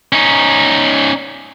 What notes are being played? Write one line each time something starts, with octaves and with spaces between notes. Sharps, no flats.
C#4 D#4